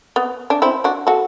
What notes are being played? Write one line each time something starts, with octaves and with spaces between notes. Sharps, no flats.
B3
D4
C4 E4
D4 F#4
F#4 A4